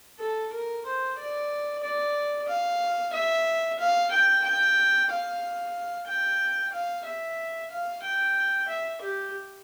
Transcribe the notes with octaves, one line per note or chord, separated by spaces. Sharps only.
A4
A#4
C5
D5
D5
F5
E5
F5
G5
G5
F5
G5
F5
E5
F5
G5
E5
G4